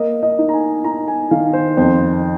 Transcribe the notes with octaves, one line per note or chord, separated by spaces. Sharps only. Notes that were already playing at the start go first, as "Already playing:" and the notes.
Already playing: A#3 D#5
D#5
D#4
A#5
G#5
D#4 A#5
G#5
D#3 F5
C5
F2 C5